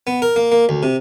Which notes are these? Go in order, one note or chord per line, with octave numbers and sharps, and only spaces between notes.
B3
A#4
A#3
A#3
D2
C3